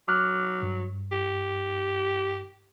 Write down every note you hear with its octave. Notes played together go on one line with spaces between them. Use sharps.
F#3 D6 F6 F#6
G2
G4